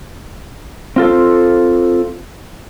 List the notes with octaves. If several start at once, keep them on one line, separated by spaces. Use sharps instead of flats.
C4 F4 A4